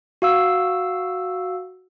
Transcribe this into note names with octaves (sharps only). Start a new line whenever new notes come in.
F#4 F5 E6